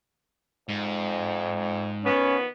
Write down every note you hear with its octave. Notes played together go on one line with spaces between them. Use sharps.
F2 G#2
D#3 F3 B3 C#4